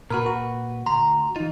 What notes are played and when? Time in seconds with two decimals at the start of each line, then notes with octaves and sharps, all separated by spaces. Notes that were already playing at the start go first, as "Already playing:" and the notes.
0.10 A#2 F#4 A#4 B4
0.26 F#4
0.86 D2 A#5 C6
1.36 E3 D#4 F4